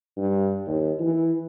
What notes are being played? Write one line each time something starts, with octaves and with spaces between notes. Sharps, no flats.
G2
D#2
E3